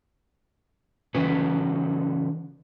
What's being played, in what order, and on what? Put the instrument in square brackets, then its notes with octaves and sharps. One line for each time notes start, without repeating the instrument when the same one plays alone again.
[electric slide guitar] C#3 E3 F#3 C#4 D#4 B4